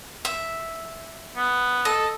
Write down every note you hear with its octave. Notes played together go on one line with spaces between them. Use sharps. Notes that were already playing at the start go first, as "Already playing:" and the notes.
E5
B3
A4 D#5